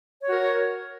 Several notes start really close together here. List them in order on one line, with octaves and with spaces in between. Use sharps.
C#5 F#4 A#4